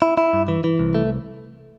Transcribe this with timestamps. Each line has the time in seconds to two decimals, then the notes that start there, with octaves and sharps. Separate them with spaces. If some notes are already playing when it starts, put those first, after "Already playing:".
0.02 E4
0.18 E4
0.33 G2
0.48 E3
0.64 E3
0.79 C2
0.95 A3